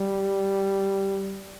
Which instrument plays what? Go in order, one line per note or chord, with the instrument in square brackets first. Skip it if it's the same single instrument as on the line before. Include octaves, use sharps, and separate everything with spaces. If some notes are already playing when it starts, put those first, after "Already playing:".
Already playing: [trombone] G3